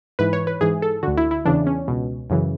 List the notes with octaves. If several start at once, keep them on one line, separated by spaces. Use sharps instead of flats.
G#2 E3 B4
C#5
B4
G#2 E3 G#4
A4
D2 D3 F#4
E4
E4
E2 C#3 E3 D4
C#4
C#2 B2
F#2 C#3 E3